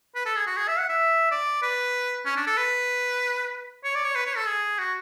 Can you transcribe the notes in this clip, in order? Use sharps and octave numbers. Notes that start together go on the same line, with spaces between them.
B4
A4
G#4
F#4
G#4
E5
F#5
E5
D5
B4
C#4
D4
A4
B4
C#5
D5
C#5
B4
C#5
A4
G#4
F#4